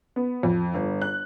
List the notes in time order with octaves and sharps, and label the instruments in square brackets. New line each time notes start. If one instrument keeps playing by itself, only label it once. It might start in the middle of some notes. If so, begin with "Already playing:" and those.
[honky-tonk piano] B3
F2
G1
F#6